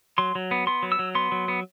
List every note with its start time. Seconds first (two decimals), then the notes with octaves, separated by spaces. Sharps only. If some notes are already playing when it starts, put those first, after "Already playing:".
0.18 F#3 C6
0.35 F#3
0.51 B3
0.67 B3 C6
0.83 F#3
0.92 E6
0.99 F#3
1.15 B3 C6
1.32 F#3
1.48 B3